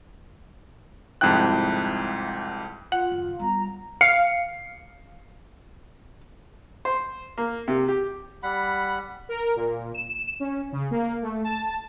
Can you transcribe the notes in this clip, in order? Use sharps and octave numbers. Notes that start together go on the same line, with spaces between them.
C2 F2 G#2 E4 G5 F#6
F4 F#5
F#1 D#2
G3 B3 A#5
F5 C7 C#7
C5
A#3
C3
G4
G3 F#5 B5
A#4
A#2
E7
C#4
C#3
A#3
A3
A5